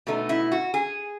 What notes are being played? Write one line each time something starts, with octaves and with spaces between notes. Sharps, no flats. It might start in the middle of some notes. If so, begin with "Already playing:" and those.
B2 A3 D#4
E4
F#4
G#4